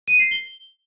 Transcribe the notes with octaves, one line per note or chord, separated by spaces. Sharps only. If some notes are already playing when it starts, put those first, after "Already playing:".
D#7
C7
G7